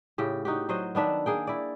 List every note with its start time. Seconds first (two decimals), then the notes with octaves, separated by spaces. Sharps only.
0.18 A2 C#3 G4
0.45 D#4 F#4 G4
0.69 F#3 F#4 C5 D#5
0.95 D#3 B3 D4 E5
1.26 A#3 G#4 G5
1.47 E4 D5